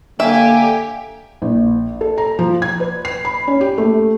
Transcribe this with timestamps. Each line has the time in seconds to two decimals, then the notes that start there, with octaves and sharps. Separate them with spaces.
0.20 D3 A#3 G4 E5 G#5
1.42 A#1
2.01 A4
2.18 A#5
2.39 F3
2.62 G#6
2.80 B4
3.05 C7
3.25 B5
3.48 C#4
3.61 G4
3.78 A3